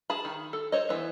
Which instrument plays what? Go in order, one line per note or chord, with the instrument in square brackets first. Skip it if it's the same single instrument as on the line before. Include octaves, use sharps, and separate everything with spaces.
[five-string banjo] G#4 A5 B5
D#3
A4
C5 C#5 D#5
E3 B3